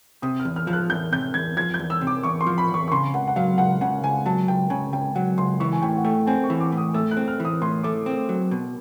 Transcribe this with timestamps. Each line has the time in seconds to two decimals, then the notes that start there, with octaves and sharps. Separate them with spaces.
0.22 C3 D#6
0.40 F6
0.45 E2
0.56 F6
0.67 F3 F6
0.73 F#6
0.90 E2 G6
1.12 C3 G6
1.34 E2 G#6
1.57 F3 G#6
1.74 G6
1.79 E2
1.90 E6
2.01 C3
2.07 D6
2.23 E2 C#6
2.41 C6
2.46 F3
2.58 B5
2.68 E2
2.74 C#6
2.88 C#6
2.92 C#3 C6
3.14 C#2 F#5
3.28 F#5
3.36 F#3 F5
3.58 C#2 F#5
3.81 C#3 F#5
4.03 C#2 G#5
4.26 F#3 A5
4.48 C#2 G5
4.70 C#3 G#5
4.93 C#2 G5
5.15 F#3 F#5
5.38 C#2 C6
5.60 E3 C#6
5.73 G#5
5.82 A2 G5
5.97 F#5
6.05 A3 G5
6.27 C4 G#5
6.44 C#6
6.50 E3
6.60 D6
6.72 A2
6.77 D#6
6.94 A3 E6
7.11 F#6
7.17 C4
7.28 F6
7.40 E3
7.45 D#6
7.62 A2 C6
7.83 A3 D6
8.06 C4
8.29 F#3
8.51 B2